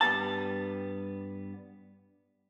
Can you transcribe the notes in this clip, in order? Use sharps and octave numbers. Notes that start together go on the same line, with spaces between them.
G2 G3 B3 A5